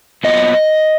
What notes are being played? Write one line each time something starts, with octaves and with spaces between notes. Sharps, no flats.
A#2 F#3 B3 F4 D#5